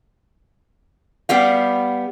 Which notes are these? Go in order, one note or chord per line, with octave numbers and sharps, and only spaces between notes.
G3 B3 G4 F5